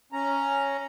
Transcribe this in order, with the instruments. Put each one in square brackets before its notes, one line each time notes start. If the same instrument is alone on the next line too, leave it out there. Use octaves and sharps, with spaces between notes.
[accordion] C#4 A#5